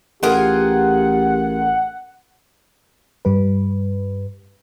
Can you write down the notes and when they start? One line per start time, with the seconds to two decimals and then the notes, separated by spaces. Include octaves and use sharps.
0.23 A1 F4 G4 G#4 A#4 F#5
3.25 G2 G3 B4